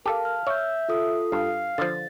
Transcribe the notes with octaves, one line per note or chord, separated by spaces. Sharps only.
G4 A4 A#4 F5 A5
F6
C#5 E5 E6 G6
F4 A4 D#6
G2 F5
D3 F3 A6